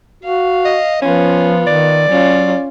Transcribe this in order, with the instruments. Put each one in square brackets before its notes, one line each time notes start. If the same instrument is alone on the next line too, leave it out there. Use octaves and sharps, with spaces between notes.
[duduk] F#4 [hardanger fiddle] F5
[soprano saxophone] D#5
[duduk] F3 [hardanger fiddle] B3 F4 [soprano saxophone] C#4
[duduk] D#3 [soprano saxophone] D5
[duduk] F#3 [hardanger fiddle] C#4 F4